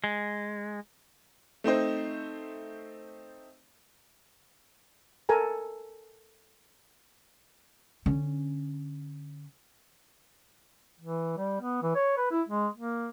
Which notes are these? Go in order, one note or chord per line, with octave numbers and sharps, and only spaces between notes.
G#3
A3 C4 D#4 C5
A4 A#4 G#5 A#5
D3 C#4
E3
G3
B3
E3
C#5
B4
E4
G#3
A#3